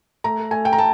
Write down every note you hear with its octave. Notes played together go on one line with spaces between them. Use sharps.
A3 A#5
A3 G#5
G5
A#5
A3 A5